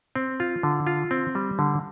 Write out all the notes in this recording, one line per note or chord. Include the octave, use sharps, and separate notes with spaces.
C4
F4
D3
F4
C4
G3
D3